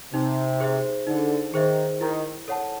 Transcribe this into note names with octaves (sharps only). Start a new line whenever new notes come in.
C3 D#4
G#4 C5 E5
D3 D#4
D#3 G#4 C5 E5
D#3 E4
A4 C#5 F#5 A5